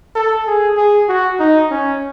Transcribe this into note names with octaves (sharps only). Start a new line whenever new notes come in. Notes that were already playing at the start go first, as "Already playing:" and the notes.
A4
G#4
G#4
F#4
D#4
C#4